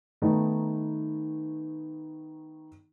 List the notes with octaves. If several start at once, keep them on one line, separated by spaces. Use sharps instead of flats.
D#3 A3 B3 D#4